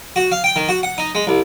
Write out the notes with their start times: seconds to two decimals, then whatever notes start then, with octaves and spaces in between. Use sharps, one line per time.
0.16 F#4
0.32 F5
0.44 G5
0.56 D#3
0.69 F#4
0.83 F#5
0.98 D#4
1.15 G#3
1.27 C2